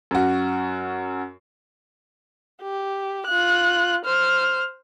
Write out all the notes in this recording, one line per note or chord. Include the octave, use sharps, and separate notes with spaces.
F#2 F#4
G4
F4 F#6
C5 F6